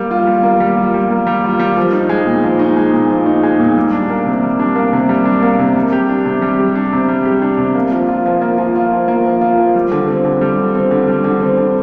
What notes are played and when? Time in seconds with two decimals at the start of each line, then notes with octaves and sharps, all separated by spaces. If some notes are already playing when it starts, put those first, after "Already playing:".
Already playing: G3 A#3
0.11 F4
0.27 G3
0.43 A#3
0.60 G3
0.77 F4
0.94 G3
1.10 A#3
1.27 G3
1.44 F4
1.60 G3
1.77 F3
1.93 D#4
2.09 G#3
2.26 A#2
2.44 F3
2.59 D#4
2.77 G#3
2.94 A#2
3.10 F3
3.26 D#4
3.43 G#3
3.60 A#2
3.77 G3
3.92 D4
4.09 A#3
4.26 C3
4.43 G3
4.60 D4
4.76 A#3
4.93 C3
5.09 G3
5.25 D4
5.42 A#3
5.59 C3
5.76 G3
5.92 G4
6.09 D4
6.25 C3
6.42 G3
6.59 G4
6.75 D4
6.93 C3
7.09 G3
7.25 G4
7.42 D4
7.58 C3
7.75 A#3
7.91 F3
8.08 F4
8.26 F3
8.41 A#3
8.58 F3
8.76 F4
8.92 F3
9.08 A#3
9.25 F3
9.41 F4
9.58 F3
9.75 G3
9.91 D3
10.08 C4
10.25 D3
10.41 G3
10.58 D3
10.75 C4
10.91 D3
11.08 G3
11.24 D3
11.41 C4
11.57 D3